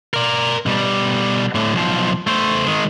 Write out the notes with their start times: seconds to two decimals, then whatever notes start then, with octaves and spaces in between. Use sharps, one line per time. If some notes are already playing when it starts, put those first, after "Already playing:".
0.14 A#4 D5
0.66 B2 G3
1.55 A2 D3
1.75 B1 F3
2.27 A3 C5
2.67 D#3 G#3